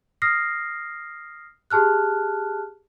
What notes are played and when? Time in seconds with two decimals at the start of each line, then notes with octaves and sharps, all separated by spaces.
0.22 D#6 F6 A#6 C7
1.70 G4 G#4 A5 F6 F#6